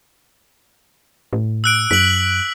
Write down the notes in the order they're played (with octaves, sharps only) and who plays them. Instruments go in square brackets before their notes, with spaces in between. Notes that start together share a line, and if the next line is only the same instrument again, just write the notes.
[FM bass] A2
[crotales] E6 F#6 D7
[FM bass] F#2 [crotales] B6 F#7